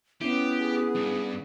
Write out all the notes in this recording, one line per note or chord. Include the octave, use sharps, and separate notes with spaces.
B3 C#4 E4 G4
G#4
G2